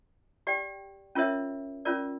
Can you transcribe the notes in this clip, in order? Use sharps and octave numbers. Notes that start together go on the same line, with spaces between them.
G4 D5 G5
C#4 F4 A#4 C#5 E5
C#4 F4 A#4 D5